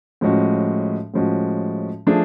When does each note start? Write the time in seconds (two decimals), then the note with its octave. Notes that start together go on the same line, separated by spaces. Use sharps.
0.21 A2 F3 G#3 C#4 F#4
1.14 A2 F3 G#3 C#4 F#4
2.07 F3 A3 D4 G#4